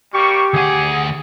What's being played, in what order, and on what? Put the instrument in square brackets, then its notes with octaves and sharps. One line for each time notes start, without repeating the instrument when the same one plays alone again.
[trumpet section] G3 A#3 C#6 [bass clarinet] G4
[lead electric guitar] D2 F#5 [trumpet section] G#4